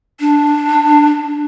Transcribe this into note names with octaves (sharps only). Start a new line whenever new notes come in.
D4